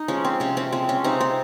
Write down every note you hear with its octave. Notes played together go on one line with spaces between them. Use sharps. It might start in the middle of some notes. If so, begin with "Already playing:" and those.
Already playing: D#4
F3 G#3 C#4
C4
C3 C#4
C4
F3 G#3 C4
C#4
C3 C4 D#4
C4